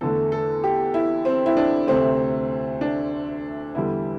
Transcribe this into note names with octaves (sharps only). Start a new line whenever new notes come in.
E2 D3 A3 A4
A4
G4
E4
C4
E4
D4
D2 C3 A3 C4
D4
E2 D3 G3 E4